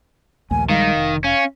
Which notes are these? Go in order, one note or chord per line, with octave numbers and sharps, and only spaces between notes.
A#1 D#2 A3 G#5
A#1 D#3 G3 G#3 F5
F1
C#4 F5